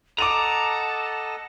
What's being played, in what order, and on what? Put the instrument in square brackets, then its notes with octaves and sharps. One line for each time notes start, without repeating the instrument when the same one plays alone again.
[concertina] A4 D#5 F#5 [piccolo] A5 [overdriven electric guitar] A#5 [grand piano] D6 D#7 F7